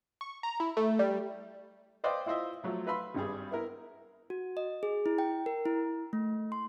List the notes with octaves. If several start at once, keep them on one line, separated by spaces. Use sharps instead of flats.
C#6
A#5
E4
A3
G3
B4 C5 D5 D#5 F5 G5
E4 F4 C5 D#5 E5
F3 F#3 A3
B4 E5 F5 B5 C6
G#1 G2 G3 G#4
B3 E4 A#4
F#4
D#5
G#4
E4
G5
A#4
E4
A3
C6